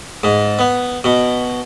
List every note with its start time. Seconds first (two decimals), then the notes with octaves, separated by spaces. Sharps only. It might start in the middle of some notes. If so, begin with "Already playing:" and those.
0.23 G#2
0.59 B3
1.04 B2